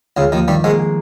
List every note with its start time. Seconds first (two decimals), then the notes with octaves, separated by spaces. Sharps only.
0.17 C#2 C#3 F4
0.32 D#2 D#3 F3
0.48 G2 D#3 G3
0.64 G#2 G#3 A#3
0.79 G#3